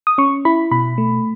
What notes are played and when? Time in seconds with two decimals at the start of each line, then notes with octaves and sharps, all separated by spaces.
0.07 D#6
0.18 C#4 C#6
0.45 E4 B5
0.71 B2 B5
0.98 A3